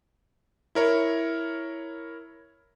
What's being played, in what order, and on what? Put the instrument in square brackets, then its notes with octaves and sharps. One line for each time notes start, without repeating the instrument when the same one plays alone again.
[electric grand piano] E4 A#4 C#5